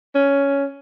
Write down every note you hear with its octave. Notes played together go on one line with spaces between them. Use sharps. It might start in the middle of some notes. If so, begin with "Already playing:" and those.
C#4